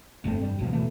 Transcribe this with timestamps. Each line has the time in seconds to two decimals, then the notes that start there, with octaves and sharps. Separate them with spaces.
0.24 F1 G2 A3 C4
0.41 G2 G3
0.59 D1 A1 B2 F3
0.73 B2 E3 A3